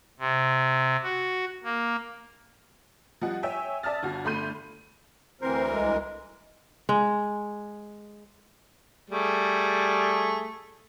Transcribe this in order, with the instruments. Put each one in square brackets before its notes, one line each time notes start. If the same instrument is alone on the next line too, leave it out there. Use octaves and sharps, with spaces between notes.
[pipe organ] C3
F#4
A#3
[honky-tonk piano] F3 G3 D#5 F#5
C#5 E5 G5 G#5
D5 E5 A5 D#6 F6 A6
G1 F#4
G1 A3 B5 C6 G6 D#7
[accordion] D2 E3 A#4 [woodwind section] C4 C5
[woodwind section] C2 G#3
[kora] G#3
[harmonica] G3 A3 G#4